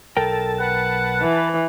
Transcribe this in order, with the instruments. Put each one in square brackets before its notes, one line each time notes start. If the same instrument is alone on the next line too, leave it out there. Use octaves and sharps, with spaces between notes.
[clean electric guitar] B1 A#4 G5 [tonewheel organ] A4 A5
[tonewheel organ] B4 A5 [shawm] F#5
[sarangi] E3